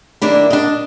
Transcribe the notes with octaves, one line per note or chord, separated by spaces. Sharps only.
D#3 A#3 D4 E4
D4 D#5